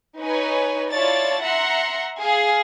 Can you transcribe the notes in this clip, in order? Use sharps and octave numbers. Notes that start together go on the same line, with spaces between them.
D#4 B4 C#5 G#5
E4 F4 C#5 D5 A5 A6
E5 F#5 A#5 C6 C#7
G#4 F5